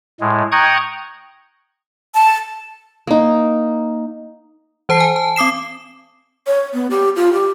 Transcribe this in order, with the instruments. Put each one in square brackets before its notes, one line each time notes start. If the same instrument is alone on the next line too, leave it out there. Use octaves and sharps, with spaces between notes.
[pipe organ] A2 G#3
G5 A#5 C#6 D#6 F#6 G#6
[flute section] A5
[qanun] A#3 D#4
[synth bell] E3 C5 A5 C7
G#5
A5
C4 D6 D#6 C7 E7
[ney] C#5
B3
G4
F4
G4